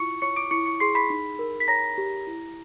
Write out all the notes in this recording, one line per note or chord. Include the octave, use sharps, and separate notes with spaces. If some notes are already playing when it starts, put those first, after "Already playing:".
Already playing: E4 F4 C#6 C#7
C#5 C#6 C#7
D6 D7
E4 C#6 C#7
C#6 C#7
G#4 C6 C7
B5 B6
D#4
A#4
B6
C#5 A#5 A#6
G4
E4